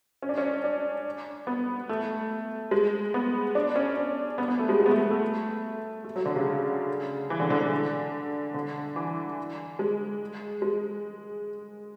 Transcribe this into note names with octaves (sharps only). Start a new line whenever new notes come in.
C#4
D4
C#4
D4
B3
A3
G#3
B3
D4
C#4
C#4
B3
B3
A3
G#3
G#3
B3
A3
B3
A3
A3
F#3
D3
C#3
E3
D3
D3
D3
D3
E3
G#3
G#3